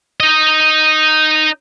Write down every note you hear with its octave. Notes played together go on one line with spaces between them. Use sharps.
D#4 D#5